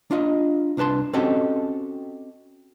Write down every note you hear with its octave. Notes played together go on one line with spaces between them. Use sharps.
D4 F4 D#5
C2 D4 B4 A5 C6
C4 C#4 F#4 G4 A4 D#5